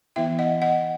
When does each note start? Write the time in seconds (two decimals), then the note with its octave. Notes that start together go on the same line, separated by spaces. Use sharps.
0.16 E3 B3 E4 E5 G5
0.39 D#5 F#5
0.62 D#5 F#5